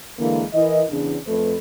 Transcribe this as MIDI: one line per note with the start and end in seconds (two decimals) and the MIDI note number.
0.19 0.43 50
0.19 0.43 52
0.19 0.43 56
0.19 0.43 58
0.53 0.81 52
0.53 0.81 64
0.53 0.81 70
0.53 0.81 75
0.90 1.16 40
0.90 1.16 49
0.90 1.16 62
1.26 1.54 41
1.26 1.54 57
1.26 1.54 69
1.26 1.54 71